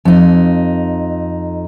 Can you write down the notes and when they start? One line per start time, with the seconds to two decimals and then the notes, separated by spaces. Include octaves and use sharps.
0.05 F2 D#4